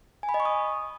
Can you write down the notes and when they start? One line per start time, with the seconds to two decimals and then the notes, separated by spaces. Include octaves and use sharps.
0.23 G#5
0.29 B5
0.34 D#5
0.40 C#6
0.45 D#6